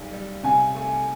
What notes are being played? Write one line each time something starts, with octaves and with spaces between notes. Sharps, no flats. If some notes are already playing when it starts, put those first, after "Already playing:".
Already playing: B1 G3
G3
C3 G#5
A3